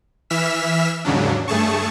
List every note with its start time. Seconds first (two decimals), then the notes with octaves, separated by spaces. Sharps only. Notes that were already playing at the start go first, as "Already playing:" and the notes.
0.30 E3 E5 F6 B6 E7
1.05 D#2 G#2 C#3 F#3 D4
1.48 G2 A3 G#4 A5 C#6